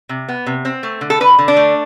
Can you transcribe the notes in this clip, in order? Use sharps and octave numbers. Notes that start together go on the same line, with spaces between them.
C3
B3
C3
C4
A3
D3
A4
D3 B4
D3
D4
A3